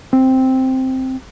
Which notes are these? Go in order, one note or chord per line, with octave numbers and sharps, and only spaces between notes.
C4